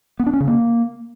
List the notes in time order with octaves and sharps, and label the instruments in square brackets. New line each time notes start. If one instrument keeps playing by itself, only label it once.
[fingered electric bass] B3
D4
C#4
C#3
A#3